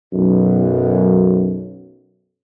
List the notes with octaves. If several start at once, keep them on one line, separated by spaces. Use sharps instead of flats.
B1 F#2